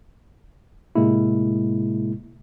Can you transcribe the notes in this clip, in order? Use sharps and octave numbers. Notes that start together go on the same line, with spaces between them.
A2 C3 G#3 A#3 E4